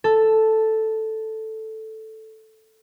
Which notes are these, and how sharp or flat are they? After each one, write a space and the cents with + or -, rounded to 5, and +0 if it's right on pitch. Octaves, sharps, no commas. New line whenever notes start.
A4 +0